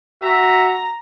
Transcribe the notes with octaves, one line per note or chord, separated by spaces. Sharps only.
F#4 E5 A#5